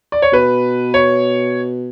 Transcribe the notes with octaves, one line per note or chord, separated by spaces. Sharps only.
D5
C#5
B2 B4
C#5